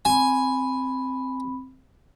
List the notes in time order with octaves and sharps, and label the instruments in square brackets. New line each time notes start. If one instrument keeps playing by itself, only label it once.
[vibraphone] C4 B5 [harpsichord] G#5